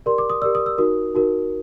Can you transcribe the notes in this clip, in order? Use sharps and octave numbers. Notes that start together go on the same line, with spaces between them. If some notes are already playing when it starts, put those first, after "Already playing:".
G4 A#4 D5 C6
D6
D#6
G4 A#4 D5 E6
D#6
E6
D#4 F#4 A#4 D#6
D#4 F#4 A#4